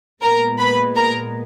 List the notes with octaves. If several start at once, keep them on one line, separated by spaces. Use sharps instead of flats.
A#2 G#3 B3 A#4 A#5
B4 B5
A#4 A#5